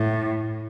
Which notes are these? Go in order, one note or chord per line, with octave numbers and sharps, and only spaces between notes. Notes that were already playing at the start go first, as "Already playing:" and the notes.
Already playing: A2